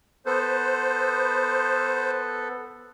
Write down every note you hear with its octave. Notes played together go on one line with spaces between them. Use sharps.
B3 A4 B4 C5